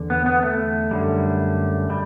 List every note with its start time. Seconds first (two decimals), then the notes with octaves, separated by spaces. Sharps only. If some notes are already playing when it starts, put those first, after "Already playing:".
Already playing: E2 D3
0.10 B3
0.26 B3
0.43 A3
0.91 F#2 D3 G3
1.90 G3